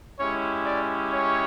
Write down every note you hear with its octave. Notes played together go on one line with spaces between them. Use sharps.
G#3 C#4 E4 G4 C#5
D5
C#5